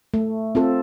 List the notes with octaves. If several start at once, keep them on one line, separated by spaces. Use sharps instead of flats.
A3
C4 F4 A4